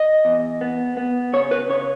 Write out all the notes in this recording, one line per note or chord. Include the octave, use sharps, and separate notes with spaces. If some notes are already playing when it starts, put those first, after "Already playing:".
Already playing: D#5
E2
B3
B3
C#3 C#5
B4
C#3 C#5